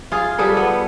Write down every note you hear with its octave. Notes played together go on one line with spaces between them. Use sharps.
F4 G#4
G3 G#4 A4 B4
B3